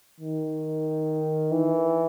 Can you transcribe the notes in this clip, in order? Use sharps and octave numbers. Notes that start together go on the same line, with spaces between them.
D#3
E3